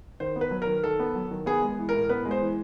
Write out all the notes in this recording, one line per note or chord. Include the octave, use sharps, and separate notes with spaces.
D#3 C5
B3
B4
F#3
D#3 A#4
D#3 A4
B3
F#3
D#3
B3 G#4
G#3
E3
A2 A#4
B3 B4
G#3
C5
E3